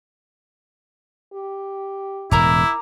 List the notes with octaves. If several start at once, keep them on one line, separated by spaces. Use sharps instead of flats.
G4
E1 A2 E4 A#4 A#5 D6